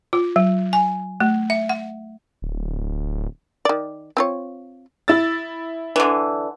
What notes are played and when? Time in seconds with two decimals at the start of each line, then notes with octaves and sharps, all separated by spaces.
0.13 F4
0.36 F#3
0.73 G#5
1.20 A3
1.50 E5
1.69 F#5
2.42 D1
3.65 D#3 D5
4.17 C4 F4 C#5
5.08 E4 E6 A6
5.96 D3 E3